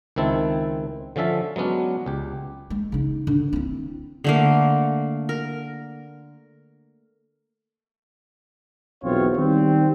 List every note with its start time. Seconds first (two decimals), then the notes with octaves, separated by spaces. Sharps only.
0.16 C#2 D#3 C4 E4 A5
1.16 D3 F3 C#4 E5 A5
1.56 F#3 G#3 B3 C#4 D4
2.06 C#2 G4
2.70 G#3
2.92 C#3 D#4
3.27 D3
3.53 C4 E4
4.24 D3 A3 A#3
5.29 A#4
9.03 B1 E2 C4 F4 C#5
9.37 D#3 G3 C4